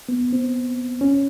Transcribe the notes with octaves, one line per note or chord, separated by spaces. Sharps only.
B3
C4
C#4